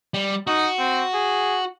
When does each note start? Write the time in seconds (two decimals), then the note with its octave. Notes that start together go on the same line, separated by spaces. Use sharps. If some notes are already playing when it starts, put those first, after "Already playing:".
0.14 G3
0.47 D#4 F#4
0.78 C4
1.14 G#4